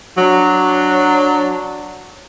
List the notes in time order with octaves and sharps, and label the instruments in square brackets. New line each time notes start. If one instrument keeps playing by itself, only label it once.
[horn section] F#3 D4